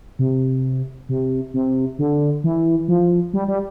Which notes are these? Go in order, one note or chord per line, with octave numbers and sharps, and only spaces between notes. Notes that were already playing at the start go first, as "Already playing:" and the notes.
C3
C3
C3
D3
E3
F3
G3
G3